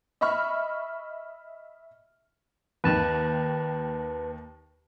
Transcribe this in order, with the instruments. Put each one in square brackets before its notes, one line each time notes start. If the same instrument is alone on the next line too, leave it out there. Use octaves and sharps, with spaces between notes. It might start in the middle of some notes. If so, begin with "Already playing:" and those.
[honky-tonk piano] D#5 E5 B5 C#6 F6
[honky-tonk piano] D#2 D#3 [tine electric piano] B4 A5